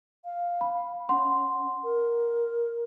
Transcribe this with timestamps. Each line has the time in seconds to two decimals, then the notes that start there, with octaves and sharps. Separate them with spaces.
0.25 F5
0.61 B5
1.09 C#4 F#5 C6
1.84 A#4